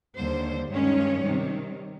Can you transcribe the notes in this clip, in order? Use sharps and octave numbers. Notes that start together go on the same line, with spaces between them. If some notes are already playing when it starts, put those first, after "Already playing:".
D#2 D3 G3 C5
G2 D#3 G#3 C#4 C#5
C3 D#3 G3